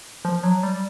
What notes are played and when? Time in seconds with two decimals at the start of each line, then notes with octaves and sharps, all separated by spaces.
0.25 F3
0.43 F#3
0.63 G3